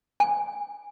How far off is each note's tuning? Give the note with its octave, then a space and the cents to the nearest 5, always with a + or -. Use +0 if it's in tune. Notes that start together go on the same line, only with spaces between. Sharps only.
G#5 -10